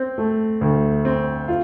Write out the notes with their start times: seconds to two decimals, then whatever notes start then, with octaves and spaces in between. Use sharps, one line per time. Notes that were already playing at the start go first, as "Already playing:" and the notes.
Already playing: C4
0.18 A3
0.61 D2
1.05 C4
1.48 F4